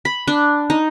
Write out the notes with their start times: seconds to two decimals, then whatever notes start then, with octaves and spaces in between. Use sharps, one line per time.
0.05 B5
0.28 D4
0.70 D#4